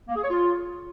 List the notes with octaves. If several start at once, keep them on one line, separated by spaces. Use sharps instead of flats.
A#3
G#4
C#5
F4